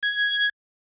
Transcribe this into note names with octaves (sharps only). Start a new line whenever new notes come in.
G#6